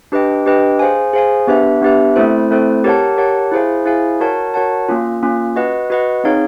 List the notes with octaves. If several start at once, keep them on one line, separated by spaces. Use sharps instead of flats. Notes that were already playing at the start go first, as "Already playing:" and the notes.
D4 G4 B4 D#5 G5
D4 G4 B4 D#5 G5
G#4 C5 F5 G#5
G#4 C5 F5 G#5
B3 D4 G4 B4 E5
B3 D4 G4 B4 E5
A3 C4 E4 A4 C5
A3 C4 E4 A4 C5
G4 A#4 C#5 F#5 A5
G4 A#4 C#5 F#5 A5
E4 G#4 C5 F5 G#5
E4 G#4 C5 F5 G#5
F#4 A#4 C#5 F#5 A5
F#4 A#4 C#5 F#5 A5
A#3 C#4 F4
A#3 C#4 F4
F#4 B4 D#5 F#5
F#4 B4 D#5 F#5
C4 D#4 G#4 C#5 F5